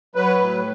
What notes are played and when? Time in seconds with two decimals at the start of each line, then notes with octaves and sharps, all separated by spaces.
0.15 F#3 B4
0.38 A2